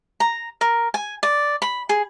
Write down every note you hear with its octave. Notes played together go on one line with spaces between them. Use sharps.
A#5
A#4
G#5
D5
B5
G#4